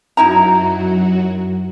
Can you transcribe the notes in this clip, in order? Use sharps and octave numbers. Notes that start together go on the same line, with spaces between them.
F#2 F#3 D#4 E4 F#4 A#5